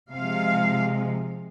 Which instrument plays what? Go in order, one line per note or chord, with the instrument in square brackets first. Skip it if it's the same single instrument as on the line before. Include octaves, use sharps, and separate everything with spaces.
[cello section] C3 F3 G#3 F5